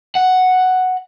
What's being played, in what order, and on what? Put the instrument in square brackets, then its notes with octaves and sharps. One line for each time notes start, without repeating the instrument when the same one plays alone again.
[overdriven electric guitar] F#5